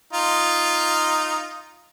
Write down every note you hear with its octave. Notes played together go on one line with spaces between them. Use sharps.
D#4 F4